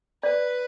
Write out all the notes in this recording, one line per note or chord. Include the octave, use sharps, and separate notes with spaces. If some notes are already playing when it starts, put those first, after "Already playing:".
B4 D5